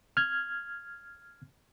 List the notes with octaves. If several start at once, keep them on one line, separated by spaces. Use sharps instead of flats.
F6 G#6